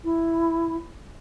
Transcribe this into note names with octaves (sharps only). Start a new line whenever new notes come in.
E4